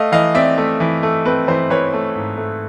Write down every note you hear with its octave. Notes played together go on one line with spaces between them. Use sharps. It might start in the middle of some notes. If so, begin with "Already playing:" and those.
Already playing: A3 D#5 F5
E3 D#5 F5
C4 D5 E5
A3
E3
A3
C4 B4
E3 C5
E3 B4 C#5
A3
G#2
A3